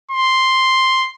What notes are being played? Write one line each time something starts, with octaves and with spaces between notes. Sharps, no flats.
C6